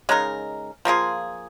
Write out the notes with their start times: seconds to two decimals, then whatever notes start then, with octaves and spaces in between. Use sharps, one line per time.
0.09 C#3 G#3 D#4 A#4
0.85 F3 A#3 F4 G#4